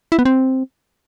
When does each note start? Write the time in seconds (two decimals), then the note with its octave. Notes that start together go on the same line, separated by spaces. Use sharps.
0.12 E4
0.19 B3
0.25 C4